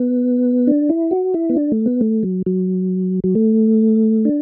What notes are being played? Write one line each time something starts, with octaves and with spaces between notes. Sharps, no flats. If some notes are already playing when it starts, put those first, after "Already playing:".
Already playing: B3
D4
E4
F#4
E4
B3
D4
A3
B3
A3
F#3
F#3
F#3
A3
D4